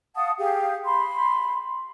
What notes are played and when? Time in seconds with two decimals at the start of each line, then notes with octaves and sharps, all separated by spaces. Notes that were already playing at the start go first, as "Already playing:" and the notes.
0.15 F5 F#5 A5 D#6
0.38 G4 G#4 F5
0.85 B5 C6